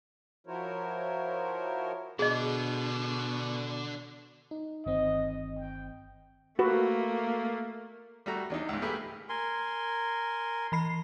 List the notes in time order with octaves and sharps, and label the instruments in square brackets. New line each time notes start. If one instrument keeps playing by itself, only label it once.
[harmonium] F3 E4 F#4 A#4 C5 C#5
[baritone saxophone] B2 [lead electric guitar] D3 D4 [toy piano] G#4 D#5
[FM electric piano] D#4
[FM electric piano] G1 D#3 C4 [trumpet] D#5
[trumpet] G5
[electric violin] A3 A#3 [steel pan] F#4 B4
[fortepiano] G3 A3 F#4 A#5
E2 D4 D#4
C#2 G#2
A3 A#3 G4 G#4 A#4 B4
[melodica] A#4 G#5 C6
[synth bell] E3 B5 C7